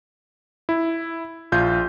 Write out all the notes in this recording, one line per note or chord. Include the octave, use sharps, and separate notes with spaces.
E4
A#1 F4 G6